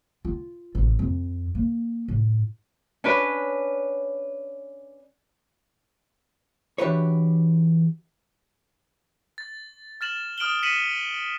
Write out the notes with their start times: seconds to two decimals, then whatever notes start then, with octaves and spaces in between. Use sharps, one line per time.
0.25 F4
0.75 A1
0.99 F2
1.55 A#3
2.08 A2
3.04 C#4 D4 B4
6.78 E3 D4 F#4 G4 B4 C#5
9.38 A6
10.01 F6 A6 E7 F#7
10.38 D#6 F6 D7 E7 F#7 G7
10.63 B6 C#7 D#7 E7 F#7